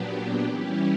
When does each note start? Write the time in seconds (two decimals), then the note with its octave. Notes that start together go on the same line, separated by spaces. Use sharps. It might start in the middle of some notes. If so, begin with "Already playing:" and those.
Already playing: A#2 F#3 B3 D4 G4
0.44 E3 G3 C#4 E4 G4